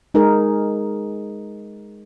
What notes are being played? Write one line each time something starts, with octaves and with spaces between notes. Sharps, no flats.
G#3 D#4 G#4 A#4